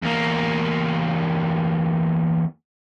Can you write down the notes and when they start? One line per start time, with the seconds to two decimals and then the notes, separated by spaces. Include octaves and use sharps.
0.02 E2 A#3